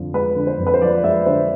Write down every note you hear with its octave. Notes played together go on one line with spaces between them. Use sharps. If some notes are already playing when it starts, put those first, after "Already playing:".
Already playing: F2 D3 F3
G#3 B4
D3
C5
F2
B4
C5
F3 D5
G#3 E5
D3 C5